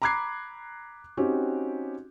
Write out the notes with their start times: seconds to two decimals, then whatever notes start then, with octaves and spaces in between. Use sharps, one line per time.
0.02 A#5 B5 D6 F#6 G#6 C7
1.17 C4 C#4 D#4 F#4 G4